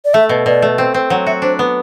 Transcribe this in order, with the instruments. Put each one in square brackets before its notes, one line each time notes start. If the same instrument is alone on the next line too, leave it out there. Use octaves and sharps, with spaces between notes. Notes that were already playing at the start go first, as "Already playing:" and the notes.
[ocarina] D5
[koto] A3 [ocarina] E5
[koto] B2
[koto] B2 [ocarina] D5
[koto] A3
C4
C4
[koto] F#3 [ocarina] F#5
[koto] F#4 [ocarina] E5
[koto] D4 [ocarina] C5
[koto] B3